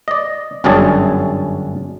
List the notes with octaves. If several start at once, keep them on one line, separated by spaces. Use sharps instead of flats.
D5 D#5
G1 F#2 C#4 D4 G#4 A5